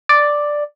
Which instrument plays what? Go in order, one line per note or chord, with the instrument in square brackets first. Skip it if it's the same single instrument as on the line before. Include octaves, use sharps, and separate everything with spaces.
[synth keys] D5